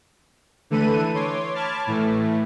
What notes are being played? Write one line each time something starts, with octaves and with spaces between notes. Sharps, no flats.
D3 E3 A3 A4 B4 D#7
C#5 C6 D6
A5 B5 D6 F6 G#6 A6
A2 E3 A3